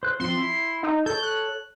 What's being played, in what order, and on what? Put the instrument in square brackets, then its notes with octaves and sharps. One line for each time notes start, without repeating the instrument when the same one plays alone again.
[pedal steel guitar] C5 F#6
[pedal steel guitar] F3 C4 [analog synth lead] C6
[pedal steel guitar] E4 B5
[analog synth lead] D#4
[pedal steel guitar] A4 C#5 [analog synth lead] G6
[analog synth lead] F#6